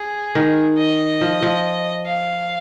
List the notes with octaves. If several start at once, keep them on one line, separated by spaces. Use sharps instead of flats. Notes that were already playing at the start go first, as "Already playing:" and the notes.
Already playing: G#4
D#3
D#5
F3
F3
F5